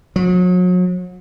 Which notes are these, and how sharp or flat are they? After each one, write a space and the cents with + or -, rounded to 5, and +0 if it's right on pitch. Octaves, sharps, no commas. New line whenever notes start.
F#3 -35